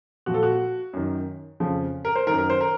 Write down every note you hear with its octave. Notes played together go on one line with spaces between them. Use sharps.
A#2 F3 F#4
A4
F#4
F#2 D#3
F2 C#3 F3
A#4
C5
F#2 D#3 A#4
A#4
C5
A#4